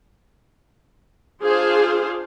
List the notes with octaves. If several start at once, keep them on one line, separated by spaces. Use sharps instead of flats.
D4 F4 G#4 C5 F5